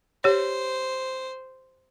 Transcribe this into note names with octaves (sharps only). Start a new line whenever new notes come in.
G4 C5 C#5